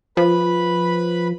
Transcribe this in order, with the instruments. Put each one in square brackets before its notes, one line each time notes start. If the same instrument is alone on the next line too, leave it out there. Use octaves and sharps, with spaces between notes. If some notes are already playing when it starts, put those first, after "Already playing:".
[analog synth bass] F3 [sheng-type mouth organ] B4 B5